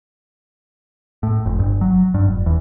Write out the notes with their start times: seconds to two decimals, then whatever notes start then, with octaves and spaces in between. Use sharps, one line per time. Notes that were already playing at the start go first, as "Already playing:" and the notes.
1.23 A2
1.46 F1
1.59 G1
1.81 F#3
2.14 G2
2.26 F1
2.46 E2